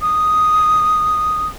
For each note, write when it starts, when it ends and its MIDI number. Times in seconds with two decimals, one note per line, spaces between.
0.02 1.47 87